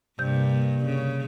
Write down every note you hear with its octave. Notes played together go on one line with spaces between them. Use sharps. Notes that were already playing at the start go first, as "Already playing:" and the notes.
G2 C3 A#3 G6
C#3